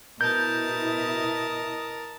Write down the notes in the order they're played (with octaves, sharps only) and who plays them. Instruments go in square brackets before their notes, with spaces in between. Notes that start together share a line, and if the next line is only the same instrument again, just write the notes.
[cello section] B2 E4 [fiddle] A#4 A5 [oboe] D#5 [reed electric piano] G6